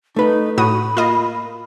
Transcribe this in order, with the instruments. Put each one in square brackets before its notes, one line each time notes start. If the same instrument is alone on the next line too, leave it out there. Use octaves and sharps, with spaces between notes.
[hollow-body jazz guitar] A3 B4 [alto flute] D#4
[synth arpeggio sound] A2 F#4 D#6 [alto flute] B5
[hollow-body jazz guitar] A#3 [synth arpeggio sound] F4 D#5